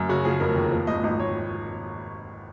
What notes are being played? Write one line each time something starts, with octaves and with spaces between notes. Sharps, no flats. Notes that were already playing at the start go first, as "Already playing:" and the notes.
Already playing: F#2
C#3 F#4
F3 G#4
F1 A#4
D#2
F3
G#1 D#5
G#1 D#5
C#5